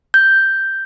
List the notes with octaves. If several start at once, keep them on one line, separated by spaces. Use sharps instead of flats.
G6